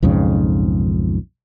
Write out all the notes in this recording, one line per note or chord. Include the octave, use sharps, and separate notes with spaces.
B1 F2 G#2 C#3